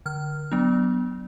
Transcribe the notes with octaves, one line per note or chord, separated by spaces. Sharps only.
D3 F6
F#3 B3 D4